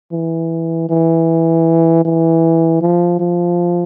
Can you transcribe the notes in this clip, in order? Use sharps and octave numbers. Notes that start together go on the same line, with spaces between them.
E3
E3
E3
F3
F3